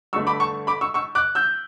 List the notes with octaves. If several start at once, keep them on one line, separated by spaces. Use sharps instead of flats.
G2 D3 A3 C#6 E6
B5 D6
A5 C#6
B5 D6
C#6 E6
C#6 E6
D6 F#6
E6 G6